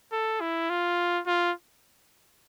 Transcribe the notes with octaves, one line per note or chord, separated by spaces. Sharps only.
A4
E4
F4
F4